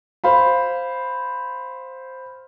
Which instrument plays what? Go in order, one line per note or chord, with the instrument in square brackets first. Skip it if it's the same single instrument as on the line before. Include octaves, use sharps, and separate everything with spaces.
[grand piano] C5 F5 B5